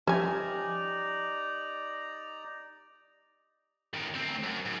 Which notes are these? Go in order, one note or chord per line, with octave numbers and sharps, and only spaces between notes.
F3 C#4 D#4 G4 D5 E5 G#5 A#5
F#2 D#3
D2 C4
F#2
G#2